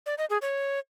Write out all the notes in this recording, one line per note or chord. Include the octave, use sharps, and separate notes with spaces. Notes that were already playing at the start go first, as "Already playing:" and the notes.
D5
D#5
G#4
C#5